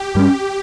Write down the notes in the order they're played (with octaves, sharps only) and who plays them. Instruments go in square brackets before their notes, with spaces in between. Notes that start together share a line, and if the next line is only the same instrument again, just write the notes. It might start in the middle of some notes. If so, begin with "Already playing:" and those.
Already playing: [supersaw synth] G4
[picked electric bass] G2 G3 C#4